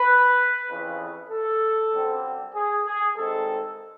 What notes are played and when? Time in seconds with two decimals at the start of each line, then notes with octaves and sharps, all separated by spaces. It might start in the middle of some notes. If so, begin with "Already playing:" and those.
Already playing: B4
0.68 F2 C#3 E3
1.30 A4
1.92 F#2 D3 G3 C4
2.55 G#4
2.85 G#4
3.16 G2 D#3 G#3 C4 A4